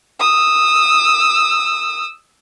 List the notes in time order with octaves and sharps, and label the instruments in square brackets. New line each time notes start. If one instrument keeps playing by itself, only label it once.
[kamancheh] D#6 E6